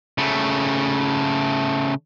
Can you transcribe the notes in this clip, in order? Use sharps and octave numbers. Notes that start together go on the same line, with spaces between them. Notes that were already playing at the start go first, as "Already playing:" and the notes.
C#3 A3